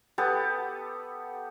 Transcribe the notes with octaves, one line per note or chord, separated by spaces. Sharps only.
B3 G4 A4 A5